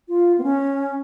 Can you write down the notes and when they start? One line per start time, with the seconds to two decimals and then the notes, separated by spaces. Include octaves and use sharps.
0.08 F4
0.38 B3
0.43 C#4